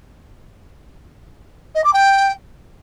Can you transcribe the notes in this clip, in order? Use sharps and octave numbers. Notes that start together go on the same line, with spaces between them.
D#5
D6
G5